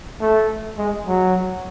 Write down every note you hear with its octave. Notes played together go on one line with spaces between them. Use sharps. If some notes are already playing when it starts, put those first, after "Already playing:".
A3
G#3
F#3